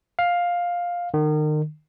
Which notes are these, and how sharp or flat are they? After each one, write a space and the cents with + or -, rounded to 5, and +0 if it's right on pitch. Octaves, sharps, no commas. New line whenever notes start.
F5 +10
D#3 -35